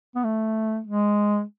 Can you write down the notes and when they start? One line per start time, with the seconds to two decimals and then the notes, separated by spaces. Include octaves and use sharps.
0.15 B3
0.24 A3
0.86 G#3